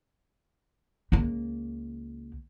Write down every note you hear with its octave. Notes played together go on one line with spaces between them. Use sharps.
C#2 A#3